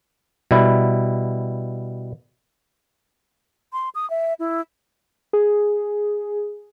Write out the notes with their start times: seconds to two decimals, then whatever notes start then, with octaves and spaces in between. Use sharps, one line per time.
0.51 B2 G3 E4
3.73 C6
3.95 D#6
4.10 E5
4.39 E4
5.33 G#4